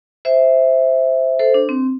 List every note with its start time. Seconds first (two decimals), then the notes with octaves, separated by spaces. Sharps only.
0.25 C5 E5
1.39 A4 C5
1.54 D4
1.69 C4